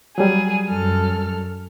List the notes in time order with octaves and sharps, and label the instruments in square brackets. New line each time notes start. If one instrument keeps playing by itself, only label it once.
[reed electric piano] F#3 G3 [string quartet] G#4
[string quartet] F#2 A4 F6